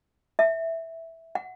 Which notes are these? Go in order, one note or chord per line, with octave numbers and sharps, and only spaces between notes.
E5
F#5